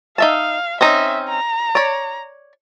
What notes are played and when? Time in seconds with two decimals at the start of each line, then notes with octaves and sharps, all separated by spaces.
0.18 D#4 E5 F5 A5
0.81 C4 C#4 D#4 E5
1.28 A#5
1.75 C#5 D5